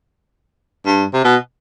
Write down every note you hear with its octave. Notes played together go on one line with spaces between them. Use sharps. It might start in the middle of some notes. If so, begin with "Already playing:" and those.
G2
C3
B2